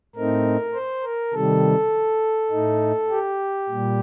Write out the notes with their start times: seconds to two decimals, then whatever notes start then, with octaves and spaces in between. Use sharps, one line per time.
0.15 A2 A3 C4 D#4 A#4
0.74 C5
1.04 A#4
1.33 C3 D#3 G3 A4
2.51 A2 A3 D#4
3.10 G4
3.69 A#2 G3